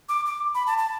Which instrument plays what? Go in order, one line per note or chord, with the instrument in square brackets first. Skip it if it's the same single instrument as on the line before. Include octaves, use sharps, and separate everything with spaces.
[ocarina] D6
D6
B5
A5
A5